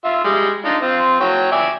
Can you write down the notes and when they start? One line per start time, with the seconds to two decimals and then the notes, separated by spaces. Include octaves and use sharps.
0.05 F4 E5
0.24 G3 G#3
0.65 D4 D#4 F4
0.82 C4 F4
1.20 F#3 C#5 G5
1.52 D5 E5 G#5